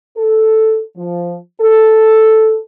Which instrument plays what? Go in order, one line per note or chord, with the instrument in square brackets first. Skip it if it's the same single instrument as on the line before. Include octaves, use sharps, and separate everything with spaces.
[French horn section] A4
F3
A4